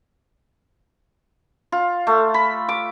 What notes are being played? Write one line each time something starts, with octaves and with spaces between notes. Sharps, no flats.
F4
A3
B5
D6